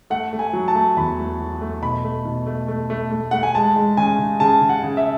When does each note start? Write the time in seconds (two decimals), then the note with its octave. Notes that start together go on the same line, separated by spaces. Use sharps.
0.10 A3 F#5
0.33 A3
0.39 G#5
0.53 F#3
0.68 A5
0.75 A3
0.97 E2 B5
1.19 A3
1.40 F#3
1.61 A3
1.82 B2 B5
2.04 A3
2.25 B2
2.47 A3
2.68 A3
2.90 A3
3.11 A3
3.31 A3 F#5
3.43 G#5
3.55 G#3 A5
3.76 G#3
3.97 C#3 G#5
4.19 C#3
4.40 C#3 A5
4.61 C#3
4.69 F#5
4.83 C#3
4.97 E5